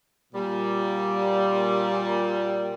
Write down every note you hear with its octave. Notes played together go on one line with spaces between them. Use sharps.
A#2 G3